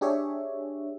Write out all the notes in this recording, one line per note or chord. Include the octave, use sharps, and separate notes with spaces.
D4 G4 G#4 C#5 E5